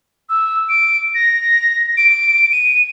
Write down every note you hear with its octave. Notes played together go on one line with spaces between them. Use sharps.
E6
D7
A#6
D7
D#7